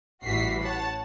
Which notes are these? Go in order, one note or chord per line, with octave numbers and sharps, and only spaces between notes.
A1 E3 G3 F#4 B6 C7
C#5 F#5 A5